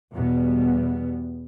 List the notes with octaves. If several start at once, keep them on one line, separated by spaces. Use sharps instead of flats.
E2 B2 G3 B3